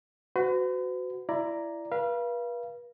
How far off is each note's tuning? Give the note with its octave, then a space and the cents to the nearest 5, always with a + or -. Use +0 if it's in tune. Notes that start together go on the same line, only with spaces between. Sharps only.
F#4 +0 B4 +45
E4 +20 D5 +0 A#5 +0
B4 -40 F5 -30